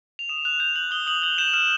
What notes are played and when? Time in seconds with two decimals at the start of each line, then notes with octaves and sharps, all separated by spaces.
0.19 F7
0.29 D#6 E7
0.45 F#6 F7
0.60 G6 F7
0.76 G6 F#7
0.91 D#6 G7
1.06 D#6 F#7
1.22 G6 F#7
1.38 G6 E7
1.53 F6 E7